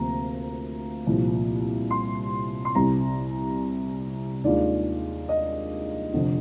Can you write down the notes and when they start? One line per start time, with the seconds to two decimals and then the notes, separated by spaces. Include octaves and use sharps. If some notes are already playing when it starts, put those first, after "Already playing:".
Already playing: D2 C3 F3 A#3 A#5
1.07 C2 A#2 F3
1.91 C6
2.65 C6
2.75 C2 C3 G3 A#5
4.44 D#2 D#3 G#3 D4 F4 D5
5.29 D#5
6.13 F1 F2 D3